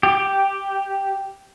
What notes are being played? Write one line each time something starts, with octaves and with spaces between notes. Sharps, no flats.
G4